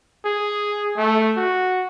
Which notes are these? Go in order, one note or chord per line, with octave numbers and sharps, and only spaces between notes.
G#4
A3
F#4